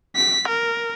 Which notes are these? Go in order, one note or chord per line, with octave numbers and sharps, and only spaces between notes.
B6
A#4